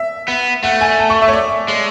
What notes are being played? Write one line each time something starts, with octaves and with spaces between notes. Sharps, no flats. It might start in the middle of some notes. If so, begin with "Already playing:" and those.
Already playing: E5
B3
A3 F#5
G#5
A5
C#6
E5
C#5
D5
G#3